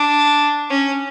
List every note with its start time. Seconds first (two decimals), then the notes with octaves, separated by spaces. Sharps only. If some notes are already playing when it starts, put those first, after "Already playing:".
Already playing: D4
0.70 C#4